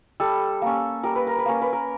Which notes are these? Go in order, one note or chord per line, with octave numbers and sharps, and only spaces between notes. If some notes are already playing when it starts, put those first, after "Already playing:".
G3 A4
A#3 C#4
G3 A#4
B4
A#4
B4
A#3 C#4 A#4
B4
A#4